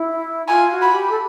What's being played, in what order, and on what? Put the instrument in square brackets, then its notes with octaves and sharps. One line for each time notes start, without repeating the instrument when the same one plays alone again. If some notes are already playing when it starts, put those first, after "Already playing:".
Already playing: [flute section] E4
[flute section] F4 [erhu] G#5
[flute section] F#4
[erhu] B5
[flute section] G4
A4